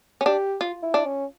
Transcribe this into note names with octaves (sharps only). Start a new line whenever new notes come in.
C#4
D4 G4
F4
E4
D4
C#4